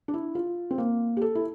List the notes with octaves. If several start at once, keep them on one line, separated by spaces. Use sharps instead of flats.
D4
E4
F4
C4
A#3
G4
A4
E4